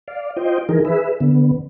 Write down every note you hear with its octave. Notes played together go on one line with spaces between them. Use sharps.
D5 F5
F4 C5 D#5 G5
E3 D#4 G#4 A#4
G#4 B4 E5
D3 B3